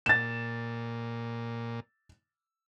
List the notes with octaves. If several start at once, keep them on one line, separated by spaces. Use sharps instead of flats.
A#2 A6 E7